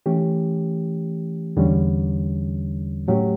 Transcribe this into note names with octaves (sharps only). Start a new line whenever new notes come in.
E3 A3 C#4 G4
E2 D3 G3 C#4
A2 F#3 A3 C#4 G4